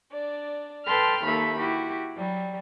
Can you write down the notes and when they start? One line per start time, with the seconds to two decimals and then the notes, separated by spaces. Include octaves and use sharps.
0.11 D4 D5
0.85 A4 B4 G5 A5 C6 F6
1.24 D#2 A#3 A4 E5 B5
1.57 E4 F#4 G4
2.16 F#3 G3